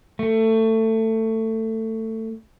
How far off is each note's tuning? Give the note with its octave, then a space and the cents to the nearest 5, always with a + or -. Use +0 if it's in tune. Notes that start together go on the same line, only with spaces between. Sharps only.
A3 +20